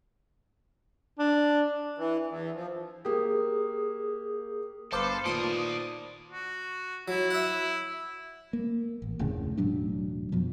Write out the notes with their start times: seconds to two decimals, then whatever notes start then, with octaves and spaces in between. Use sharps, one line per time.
1.19 D4
1.98 E3
2.27 E2
2.54 F3
3.05 A#3 G4 G#4 D#6
4.92 G1 A4 B4 C5 F5 A5 D6 C7
5.25 A#2 D#3 C5 D5 A5 D#6
6.30 F#4
7.08 F#3 E4
7.30 E5 F#5
8.53 A#3
9.02 A1
9.19 F1 D2 A2 C#3
9.58 E1 A2 F#3 D4
10.32 F2 B2 F3